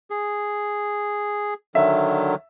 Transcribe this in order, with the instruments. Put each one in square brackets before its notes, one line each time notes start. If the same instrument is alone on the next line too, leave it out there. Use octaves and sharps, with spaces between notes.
[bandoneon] G#4
[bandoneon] D3 D#3 F#3 [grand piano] E5